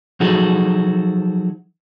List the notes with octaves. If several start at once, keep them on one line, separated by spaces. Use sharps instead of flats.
F3 F#3 D#4 F#4 G#4 A4